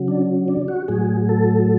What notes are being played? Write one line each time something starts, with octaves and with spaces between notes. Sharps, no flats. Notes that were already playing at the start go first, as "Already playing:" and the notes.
Already playing: C#3 F#3
D4
D4
F#4
A2 F#3 G#4
A4